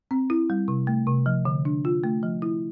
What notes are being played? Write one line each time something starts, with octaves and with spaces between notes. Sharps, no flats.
C4
E4
G3
C3
A3
C3
F3
D3
D4
F4
A3
F3
E4